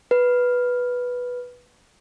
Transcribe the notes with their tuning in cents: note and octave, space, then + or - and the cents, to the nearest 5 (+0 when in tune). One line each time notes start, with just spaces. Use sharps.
B4 -5